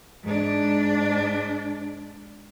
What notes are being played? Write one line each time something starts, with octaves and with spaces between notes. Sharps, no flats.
G#2 D4